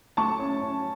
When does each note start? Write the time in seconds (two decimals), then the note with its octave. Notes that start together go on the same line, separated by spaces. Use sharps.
0.17 A3 A5 C#6
0.39 C#4
0.61 C#4